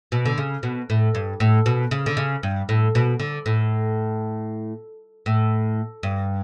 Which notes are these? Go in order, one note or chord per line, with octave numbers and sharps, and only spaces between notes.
B2
D3
C#3
B2
A2
G2
A2
B2
C#3
D3
C#3
G2
A2
B2
D3
A2
A2
G2